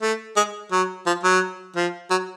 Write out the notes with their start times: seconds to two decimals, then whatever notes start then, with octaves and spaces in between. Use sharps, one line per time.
0.02 A3
0.36 G#3
0.72 F#3
1.06 F3
1.23 F#3
1.76 F3
2.10 F#3